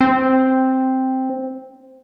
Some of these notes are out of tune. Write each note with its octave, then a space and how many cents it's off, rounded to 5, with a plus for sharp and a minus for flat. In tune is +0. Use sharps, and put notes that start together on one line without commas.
C4 +0